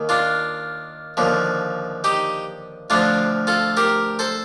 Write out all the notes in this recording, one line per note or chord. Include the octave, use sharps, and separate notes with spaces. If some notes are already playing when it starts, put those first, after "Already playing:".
Already playing: D#2 D#3
D4 F4
D#2 D3 F3
D#4 G4
D2 D3 F3 D4 F4
F4 A4
G4 A#4
A4 C5